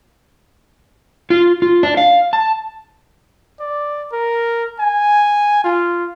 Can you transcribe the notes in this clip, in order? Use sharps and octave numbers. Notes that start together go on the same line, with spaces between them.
F4
F4
D4
F5
A5
D5
A#4
G#5
F4